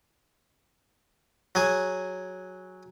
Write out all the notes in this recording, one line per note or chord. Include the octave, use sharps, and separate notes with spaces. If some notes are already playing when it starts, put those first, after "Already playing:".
F#3 G#4